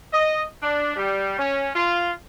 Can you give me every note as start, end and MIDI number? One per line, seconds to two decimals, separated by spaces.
0.13 0.43 75
0.62 0.93 62
0.96 1.36 55
1.37 1.69 61
1.74 2.09 65